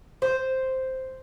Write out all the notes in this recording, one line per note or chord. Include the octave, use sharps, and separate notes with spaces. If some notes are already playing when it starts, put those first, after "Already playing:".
C5